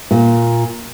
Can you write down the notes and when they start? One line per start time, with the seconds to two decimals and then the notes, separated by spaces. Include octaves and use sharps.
0.11 A#2